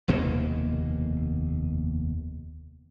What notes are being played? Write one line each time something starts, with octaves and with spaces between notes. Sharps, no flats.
F1 D#2 B2 A#3